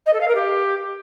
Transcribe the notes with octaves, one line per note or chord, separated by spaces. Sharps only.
D#5
A4
F5
A#4
G4